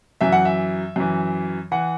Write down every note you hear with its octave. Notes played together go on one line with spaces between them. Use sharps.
F#2 E3 E5
F#5
E5
F#2 E3
E3 F#5